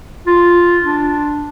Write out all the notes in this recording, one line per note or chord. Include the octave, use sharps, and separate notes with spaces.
F4
D4